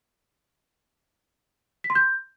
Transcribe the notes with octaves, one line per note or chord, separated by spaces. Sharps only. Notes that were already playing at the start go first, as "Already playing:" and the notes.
B6
C6
G6